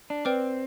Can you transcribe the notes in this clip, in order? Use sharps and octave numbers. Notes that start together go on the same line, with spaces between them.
D4
C4 B4 D5 G5 D6 F6